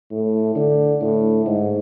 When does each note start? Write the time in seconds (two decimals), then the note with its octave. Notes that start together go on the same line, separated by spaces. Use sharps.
0.11 A2
0.56 D3
1.02 A2
1.46 G#2